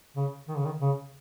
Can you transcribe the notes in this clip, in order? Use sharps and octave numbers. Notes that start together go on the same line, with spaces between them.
C#3
D#3
C#3
D#3
C#3